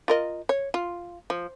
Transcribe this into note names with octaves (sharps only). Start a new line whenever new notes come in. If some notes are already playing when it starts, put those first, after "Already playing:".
F4 A#4 D#5
C#5
F4
F3